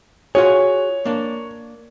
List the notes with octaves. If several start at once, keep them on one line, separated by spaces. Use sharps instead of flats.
F4 F#4 G#4 C#5
A#3 D4